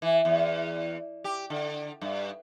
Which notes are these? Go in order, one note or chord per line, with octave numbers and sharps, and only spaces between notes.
E3
E2
G4
D3
G2